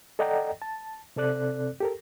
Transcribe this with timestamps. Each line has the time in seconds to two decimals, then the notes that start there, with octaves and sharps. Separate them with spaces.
0.19 A4 D5 D#5 F#5 G5 A#5
0.62 A5
1.16 C3 C4 A4 D5 F#6
1.80 G4 A4 A#4